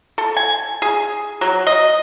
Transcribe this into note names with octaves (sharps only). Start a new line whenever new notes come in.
A4
G#5
G#4
F#3
D#5